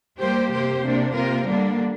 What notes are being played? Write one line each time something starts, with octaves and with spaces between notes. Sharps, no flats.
G3 A#3 G4 C5
C3 A#3 G4 C5
C3 A#3 D4
C3 A#3 F4 A#4
D3 G3 A#3 D4